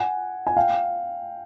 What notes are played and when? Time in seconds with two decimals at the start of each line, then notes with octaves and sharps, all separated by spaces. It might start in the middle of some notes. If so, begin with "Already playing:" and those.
Already playing: F#5 G#5
0.47 G#5
0.56 F5 G5